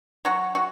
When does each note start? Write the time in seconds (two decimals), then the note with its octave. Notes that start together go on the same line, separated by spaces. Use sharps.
0.25 F#3 F#4
0.55 F#4